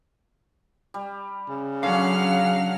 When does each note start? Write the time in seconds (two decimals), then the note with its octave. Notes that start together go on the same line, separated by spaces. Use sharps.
0.94 G3
1.49 C#3
1.83 D3 F#3 C#4 F5 F#5 F6